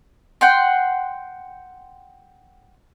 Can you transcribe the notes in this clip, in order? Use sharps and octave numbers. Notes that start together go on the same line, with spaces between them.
F#5 G5 C6